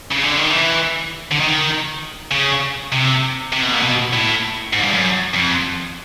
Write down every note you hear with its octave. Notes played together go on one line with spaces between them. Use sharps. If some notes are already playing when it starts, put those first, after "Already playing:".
C#3
D3
D#3
E3
D3
D#3
C#3
C3
C3
B2
A#2
B2
A2
G#2
G2
F#2
F2